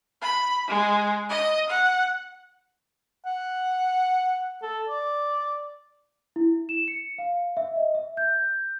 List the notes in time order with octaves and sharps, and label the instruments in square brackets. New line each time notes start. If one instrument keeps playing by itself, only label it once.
[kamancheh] B5
G#3
D#5
F#5
[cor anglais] F#5
A4
D5
[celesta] E4
E7
C#7
F5
E5
D#5
E5
G6